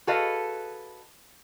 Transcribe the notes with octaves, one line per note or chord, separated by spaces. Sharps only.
F#4 G#4 A4 B4 D#5 F5